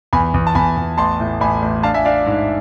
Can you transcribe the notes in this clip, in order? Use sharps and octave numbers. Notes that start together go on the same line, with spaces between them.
E2 G#5 B5
E2
A5
E2 G#5 B5
E2
A1 A5 C6
A2
A1 G#5 B5
A1
D4 F5 A5
E5 G#5
D4 D5 F5
G#2